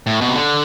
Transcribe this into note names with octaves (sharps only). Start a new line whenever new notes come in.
A2
B2
C3
D3